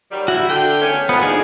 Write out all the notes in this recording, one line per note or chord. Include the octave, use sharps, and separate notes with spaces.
D#3 F#3 G3
G3 C4 E4 F#4
D3 G5
E2 A3 C#4
D#3 F3 B3
D3 F3 D4 D#4 G#4